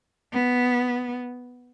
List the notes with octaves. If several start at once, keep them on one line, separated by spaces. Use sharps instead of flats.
B3